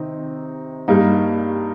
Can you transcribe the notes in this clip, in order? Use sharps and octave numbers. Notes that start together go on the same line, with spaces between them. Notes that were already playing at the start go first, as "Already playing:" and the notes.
Already playing: C3 D#3 C4 D#4
G2 G3 A#3 D#4